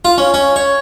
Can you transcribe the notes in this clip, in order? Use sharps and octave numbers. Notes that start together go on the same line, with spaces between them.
F4
C#4
C#4
C#5